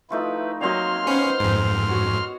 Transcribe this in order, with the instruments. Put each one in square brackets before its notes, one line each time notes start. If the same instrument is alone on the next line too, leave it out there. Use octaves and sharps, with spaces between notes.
[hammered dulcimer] F3 A3 D#4 [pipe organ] E4 B4
[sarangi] F#3 [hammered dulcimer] A#3 C4 D#5 [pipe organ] C6 F6
[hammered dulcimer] B3 [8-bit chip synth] C#4 [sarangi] C5
[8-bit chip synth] F2 G#2
[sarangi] F#4 [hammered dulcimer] C#5